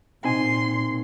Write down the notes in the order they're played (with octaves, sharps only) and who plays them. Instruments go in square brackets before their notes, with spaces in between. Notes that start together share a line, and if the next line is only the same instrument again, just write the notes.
[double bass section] A#2 [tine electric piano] C4 D#4 G#5 [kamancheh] C6